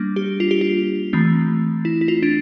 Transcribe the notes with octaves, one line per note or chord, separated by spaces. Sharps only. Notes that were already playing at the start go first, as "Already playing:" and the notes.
Already playing: G3 A#3 D4
G4
F4
G4
F4
E3 A3 C4
E4
E4
F4
D4